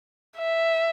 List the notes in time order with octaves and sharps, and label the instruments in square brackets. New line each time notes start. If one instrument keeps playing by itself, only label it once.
[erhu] E5